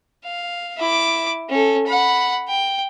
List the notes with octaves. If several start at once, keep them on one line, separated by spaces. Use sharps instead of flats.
F5
E4 D6
C#4 A4
F#5 B5
G5